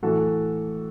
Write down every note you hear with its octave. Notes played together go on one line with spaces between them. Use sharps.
A2 E3 F#4 A4